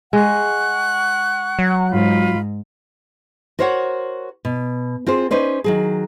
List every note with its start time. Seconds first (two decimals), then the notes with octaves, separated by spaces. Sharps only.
0.13 G#3 F#5 C#6 F#6
1.59 F#3
1.91 G#2 F4 B5
3.59 F#4 A#4 C5 C#5 E5 F#5
4.45 B2
5.07 C4 F4 G#4 C5
5.31 C#4 D#4 B4 C5 D5
5.64 D#3 F#3 G#4